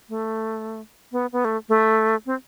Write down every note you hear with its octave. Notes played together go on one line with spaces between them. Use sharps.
A3
B3
B3
A3
A3
C4